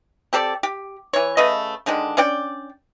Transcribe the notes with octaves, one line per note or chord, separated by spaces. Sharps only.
C4 G4 A4 D5
G4
E3 C#5
C#3 A3 B4 D#5
D3 D#3 G#3 D4
C#4 D4 D5 G5